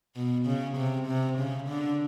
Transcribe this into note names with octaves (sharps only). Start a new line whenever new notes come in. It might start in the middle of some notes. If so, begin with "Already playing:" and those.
B2
C#3
C3
C3
C#3
D3